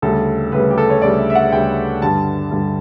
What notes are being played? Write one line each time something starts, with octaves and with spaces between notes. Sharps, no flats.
D2 C#3 G3 A4
D2 C#3 G3 B4
G4
A4
C#5
D2 C#3 G3 D5
E5
E5
F#5
D2 C#3 G3 G5
G2 D3 G3 A5
G2 D3 G3